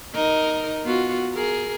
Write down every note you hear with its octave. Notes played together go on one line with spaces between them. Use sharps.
D#4 A#4 D#5
B3 F4 F#4
G#4 A#4